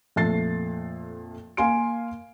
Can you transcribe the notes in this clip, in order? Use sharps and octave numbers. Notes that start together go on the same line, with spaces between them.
F2 A#2 A3 A6 C7
A#3 F5 G#5 C6 D7